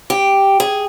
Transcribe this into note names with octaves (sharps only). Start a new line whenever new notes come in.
G4
G#4